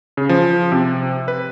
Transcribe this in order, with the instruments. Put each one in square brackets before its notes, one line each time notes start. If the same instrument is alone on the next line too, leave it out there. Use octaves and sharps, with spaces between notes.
[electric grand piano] C#3
F3
C3
B4